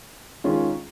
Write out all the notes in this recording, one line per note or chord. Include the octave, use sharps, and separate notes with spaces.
D#3 G#3 C#4 F4